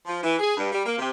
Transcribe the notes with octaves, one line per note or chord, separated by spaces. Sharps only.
F3
E3
G#4
G2
G3
A#3
C3